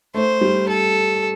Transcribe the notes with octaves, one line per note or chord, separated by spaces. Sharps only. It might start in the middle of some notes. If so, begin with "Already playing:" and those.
A3 C5
G3
A4